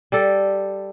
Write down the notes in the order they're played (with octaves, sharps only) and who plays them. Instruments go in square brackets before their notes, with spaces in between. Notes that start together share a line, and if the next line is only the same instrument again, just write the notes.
[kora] G3 G4 A4